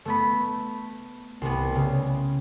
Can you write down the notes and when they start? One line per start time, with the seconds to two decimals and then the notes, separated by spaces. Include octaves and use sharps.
0.05 A3 B3 B5
1.42 C2 B3
1.75 C#3